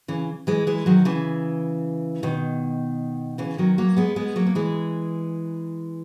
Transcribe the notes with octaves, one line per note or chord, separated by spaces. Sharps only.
C#3 E3
E3 G#3
E3 G#3
D#3 F#3
C#3 E3
B2 D#3
C#3 E3
D#3 F#3
F#3 A#3
G#3 B3
G#3 B3
F#3 A#3
A#3
E3 G#3